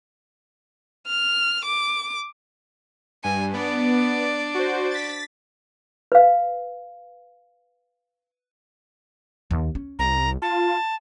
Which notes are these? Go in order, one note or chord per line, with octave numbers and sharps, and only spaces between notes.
F6
D6
G2 G#5
B3 D4 D5
F#4 C5
A6 B6
B4 F5
D#2
C#4
C2 A#5
F4 A5